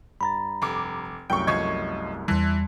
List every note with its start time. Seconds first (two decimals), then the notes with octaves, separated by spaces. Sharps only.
0.21 G2 A#5 B5 A6
0.62 F1 D6
1.30 C2 F#2 A3 G5 C#6
1.47 F3 D#5 C#6 G#6
2.28 E2 E3 G3 A5 C6